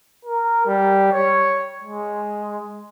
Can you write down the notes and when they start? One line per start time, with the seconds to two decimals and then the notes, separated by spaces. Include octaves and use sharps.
0.25 A#4
0.66 G3
1.12 C#5
1.82 G#3